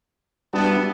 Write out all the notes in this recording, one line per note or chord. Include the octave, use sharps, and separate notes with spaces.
G3 B3 D4 E4 F#4 A5